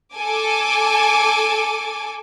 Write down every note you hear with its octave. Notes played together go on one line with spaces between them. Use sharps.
A4 G#5 D6